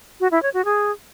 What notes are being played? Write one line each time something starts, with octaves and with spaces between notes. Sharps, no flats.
F#4
E4
C#5
F#4
G#4